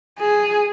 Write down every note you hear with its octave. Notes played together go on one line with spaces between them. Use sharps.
G#4